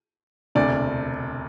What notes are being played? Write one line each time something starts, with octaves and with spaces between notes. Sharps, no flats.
E1 D2 C3 D5